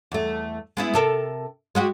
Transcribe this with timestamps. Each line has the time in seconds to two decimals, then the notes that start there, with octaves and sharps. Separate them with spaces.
0.12 E2 A3
0.77 G#3 B3 E4
0.94 C3 A4 A#4
1.75 G#3 F#4 G4